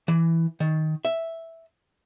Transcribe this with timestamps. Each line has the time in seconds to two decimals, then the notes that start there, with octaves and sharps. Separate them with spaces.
0.08 E3
0.60 D#3
1.05 E5